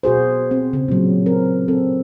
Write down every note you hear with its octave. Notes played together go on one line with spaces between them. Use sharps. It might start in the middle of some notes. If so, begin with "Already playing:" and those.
B2 F#4 G#4 C5
C4
C#3
A#2 F#3
C4 A#4
C4 A4